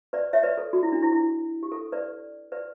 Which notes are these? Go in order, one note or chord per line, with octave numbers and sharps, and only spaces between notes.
B4 D5
C#5 E5
B4 D5
A4
F#4
E4
D4
E4
E4
G4
A4
B4 D5
B4 D5